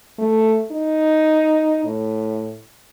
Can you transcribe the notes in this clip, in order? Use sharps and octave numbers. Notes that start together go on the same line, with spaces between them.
A3
D#4
A2